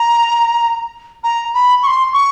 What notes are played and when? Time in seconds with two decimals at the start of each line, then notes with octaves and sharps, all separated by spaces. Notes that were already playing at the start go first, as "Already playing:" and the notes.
Already playing: A#5
1.24 A#5
1.54 B5
1.83 C#6
1.87 C6
2.13 C#6